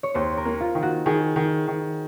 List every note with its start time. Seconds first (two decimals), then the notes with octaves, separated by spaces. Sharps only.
0.03 C#5
0.14 D#2 C5
0.37 A#4
0.45 A#3
0.61 F4
0.75 D#3
0.83 F#4
1.06 D#3 G#4
1.36 D#3
1.67 D#3